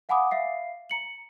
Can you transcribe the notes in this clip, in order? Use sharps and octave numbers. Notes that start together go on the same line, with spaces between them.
F5 F#5 G#5 B5 D6 D#6
E5 F5 C7
A#5 C#7 F#7